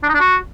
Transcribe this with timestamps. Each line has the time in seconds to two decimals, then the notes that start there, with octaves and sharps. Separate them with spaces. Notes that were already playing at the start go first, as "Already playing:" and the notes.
0.03 D4
0.09 D#4
0.14 D4
0.20 F#4